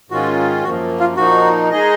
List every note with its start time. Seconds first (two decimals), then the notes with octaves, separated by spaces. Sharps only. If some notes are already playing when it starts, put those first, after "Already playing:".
0.10 G#2 D#3 G#3 C#4 F4 F#4
0.64 F#2 F3 A#3 F#4
1.00 F4
1.17 A#2 F3 A#3 D#4 F#4
1.70 G#3 D#4 G#4 D#5